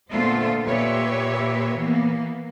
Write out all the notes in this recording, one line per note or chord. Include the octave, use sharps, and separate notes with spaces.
A#2 D3 A3 B3 F4 C5
A#2 G4 B4 C#5 E5
E3 A#3 B3